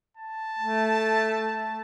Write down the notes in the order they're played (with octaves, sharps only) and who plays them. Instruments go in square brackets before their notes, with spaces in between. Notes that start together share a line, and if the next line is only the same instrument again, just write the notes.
[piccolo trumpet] A5
[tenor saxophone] A3